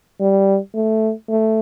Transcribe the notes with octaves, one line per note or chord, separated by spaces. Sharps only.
G3
A3
A3